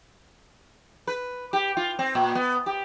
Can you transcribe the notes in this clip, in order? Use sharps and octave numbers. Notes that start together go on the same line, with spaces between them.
B4
G4
F4
C4
A#2
B3
G4